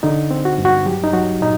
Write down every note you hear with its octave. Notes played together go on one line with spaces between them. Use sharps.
D3 D#4
C4
F#4
G2
F#4
F#3 G4
D#4
F#3 F#4
A#2 D#4